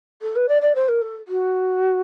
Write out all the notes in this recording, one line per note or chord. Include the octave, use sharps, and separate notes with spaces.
A4
B4
D5
D5
C5
A#4
A4
F#4